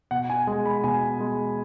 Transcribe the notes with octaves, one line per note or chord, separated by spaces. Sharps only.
B2 F#5
G#5
G#3 G#5
B5
B2 G#5
G#3